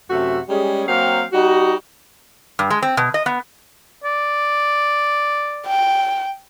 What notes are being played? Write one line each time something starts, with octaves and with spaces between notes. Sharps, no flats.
F#2 C3 A3 F#4 E5
G3 G#3 C#4 G#4
F#3 A#3 C4 F5 G5
G3 D#4 F#4
G2
G#3
C4
B2
D#5
B3
D5
G5